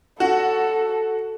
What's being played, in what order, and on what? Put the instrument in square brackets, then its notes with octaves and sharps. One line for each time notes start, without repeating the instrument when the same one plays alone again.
[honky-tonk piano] F#4 [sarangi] A4